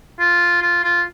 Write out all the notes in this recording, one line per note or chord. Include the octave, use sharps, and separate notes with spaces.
F4
F4
F4